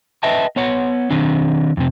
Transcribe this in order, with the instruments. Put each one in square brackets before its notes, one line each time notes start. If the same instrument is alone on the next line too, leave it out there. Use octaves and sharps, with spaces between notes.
[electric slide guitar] B4 D#5 E5 G5 A5
B3 C#5 F#5
D#3 C4 D4
F2 C3